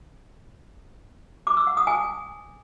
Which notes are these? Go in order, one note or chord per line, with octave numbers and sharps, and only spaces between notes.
D6
E6
F#5
D#6
G#5